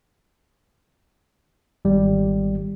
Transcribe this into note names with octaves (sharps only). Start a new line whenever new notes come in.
G#1 G3